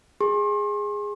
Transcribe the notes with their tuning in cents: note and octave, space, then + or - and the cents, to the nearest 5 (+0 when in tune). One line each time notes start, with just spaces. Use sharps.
G#4 -10 C6 +40